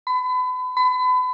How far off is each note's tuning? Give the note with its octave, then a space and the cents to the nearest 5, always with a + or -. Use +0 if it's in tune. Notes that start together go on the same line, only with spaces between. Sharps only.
B5 +35
B5 +35